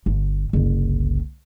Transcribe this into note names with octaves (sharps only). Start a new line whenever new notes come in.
G1
F#1 C2